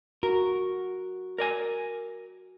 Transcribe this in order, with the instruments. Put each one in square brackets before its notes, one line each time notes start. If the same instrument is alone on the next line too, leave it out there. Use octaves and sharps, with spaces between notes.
[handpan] F#4 [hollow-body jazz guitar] A#4
[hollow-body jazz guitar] A#4 D5 G#5